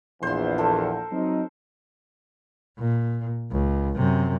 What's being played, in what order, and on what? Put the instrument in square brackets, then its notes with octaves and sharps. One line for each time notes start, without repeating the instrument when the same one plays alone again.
[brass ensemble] A#1 E2 [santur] C5 C6
[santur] A4 A#4
[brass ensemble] F#3 C4 D#4
[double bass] A#2
C#2
F#2 C3